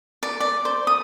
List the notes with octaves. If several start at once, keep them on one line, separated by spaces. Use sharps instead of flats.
D5
D5
C5
D#6